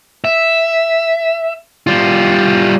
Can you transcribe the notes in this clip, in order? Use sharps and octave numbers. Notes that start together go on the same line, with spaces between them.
E5
G3 F4